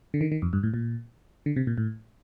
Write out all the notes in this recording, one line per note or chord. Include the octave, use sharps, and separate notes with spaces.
D3
D#3
D#3
F2
G2
A2
A#2
D3
C3
A#2
A2